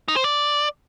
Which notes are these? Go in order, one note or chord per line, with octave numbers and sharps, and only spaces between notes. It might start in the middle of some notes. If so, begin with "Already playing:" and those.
D#4
C5
D5